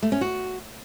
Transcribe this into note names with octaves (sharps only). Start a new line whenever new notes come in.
A3
C#4
F#4